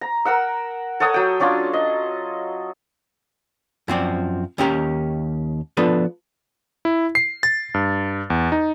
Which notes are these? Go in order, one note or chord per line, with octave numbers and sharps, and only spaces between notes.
A#5
A#4 F#5 E6
A4 C#5 F#5 D#6
F#3 G5
F#3 C#4 D4 F4
D#5
F#2 F3 C4 D5
D#2 C#4 G4 A#4
F3 B3 D4 A4 B4
E4
C7
A6
G2
E2
D#4